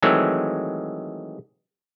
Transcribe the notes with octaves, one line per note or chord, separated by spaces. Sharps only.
D#3 E3 F#3 G#3 A3 C4